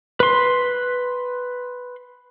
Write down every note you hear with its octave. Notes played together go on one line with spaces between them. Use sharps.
B4 C6